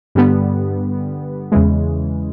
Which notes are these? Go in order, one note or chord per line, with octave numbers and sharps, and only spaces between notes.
G2 D3 G3 B3
E2 C#3 E3 G#3